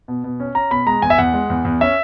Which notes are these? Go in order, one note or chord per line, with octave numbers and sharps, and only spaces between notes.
B2
B2
C#4
C#4 A#5
B2 B5
G#3 A#5
E2 G#5
E5
E2 F#5
G#3
E2
E2
C#4 E5